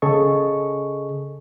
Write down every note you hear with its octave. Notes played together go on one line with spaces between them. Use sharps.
C#3 G#4 A4 D#5 C#6